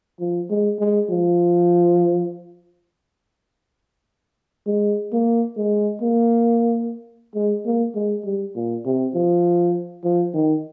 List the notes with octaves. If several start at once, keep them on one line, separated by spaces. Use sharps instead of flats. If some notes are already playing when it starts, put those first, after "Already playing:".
F3
G#3
G#3
F3
G#3
A#3
G#3
A#3
G#3
A#3
G#3
G3
A#2
C3
F3
F3
D#3